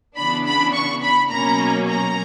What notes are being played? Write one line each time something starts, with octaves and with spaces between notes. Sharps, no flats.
C#3 E3 B3 D4 B5
B5
C#6
B5
B2 F#3 A#3 C#4 A#5
A#5